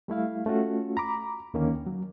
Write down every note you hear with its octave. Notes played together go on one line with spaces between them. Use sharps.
G3 A3 E4 F5
A3 C#4 F4 F#4 A4
A#5 B5 D6
D#2 D3 D#3 A#3 C#4
F#3